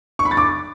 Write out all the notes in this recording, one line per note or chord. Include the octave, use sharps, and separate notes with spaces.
C#6
B5
A6
D6